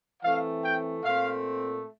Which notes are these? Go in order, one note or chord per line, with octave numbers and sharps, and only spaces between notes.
E3 A3 C4 F5
G5
A#2 A3 C4 F5